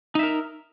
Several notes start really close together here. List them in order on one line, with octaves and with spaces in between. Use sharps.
D#4 E5 A#4